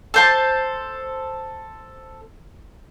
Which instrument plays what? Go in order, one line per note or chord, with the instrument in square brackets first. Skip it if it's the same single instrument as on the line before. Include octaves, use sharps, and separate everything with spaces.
[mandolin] A4 C5 A5